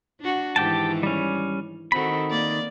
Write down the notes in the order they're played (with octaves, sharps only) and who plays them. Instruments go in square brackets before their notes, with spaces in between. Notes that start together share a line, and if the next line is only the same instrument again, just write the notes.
[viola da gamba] D4 F#4
[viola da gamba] G#2 D#3 E3 [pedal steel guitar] G4 G5 A5
[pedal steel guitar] G3 C#4
[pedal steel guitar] D#3 B5 [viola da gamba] C4 F#4 A4
[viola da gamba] A#3 D5